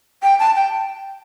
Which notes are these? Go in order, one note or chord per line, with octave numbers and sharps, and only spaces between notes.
G5
A5
G5